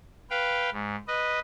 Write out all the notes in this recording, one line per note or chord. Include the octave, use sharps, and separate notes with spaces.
B4 F5 G5
G#2
B4 D#5